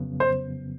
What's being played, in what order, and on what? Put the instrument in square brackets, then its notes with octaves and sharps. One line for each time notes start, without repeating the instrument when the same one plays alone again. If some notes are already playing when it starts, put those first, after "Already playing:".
Already playing: [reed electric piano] F2 C#3 F#3 B3
[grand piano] C5